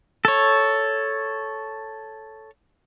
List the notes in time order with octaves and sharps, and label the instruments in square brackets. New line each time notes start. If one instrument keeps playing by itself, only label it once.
[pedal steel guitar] A4 C#5